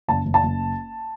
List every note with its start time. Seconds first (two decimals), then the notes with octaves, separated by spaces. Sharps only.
0.08 F#1 A5
0.25 F#1
0.34 A5
0.43 F#1